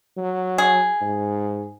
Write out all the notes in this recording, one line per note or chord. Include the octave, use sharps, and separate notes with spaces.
F#3
G#4
G#2